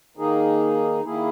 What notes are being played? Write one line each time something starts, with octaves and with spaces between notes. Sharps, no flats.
D#3 A#3 D#4 G#4
D#3 A#3 E4 G#4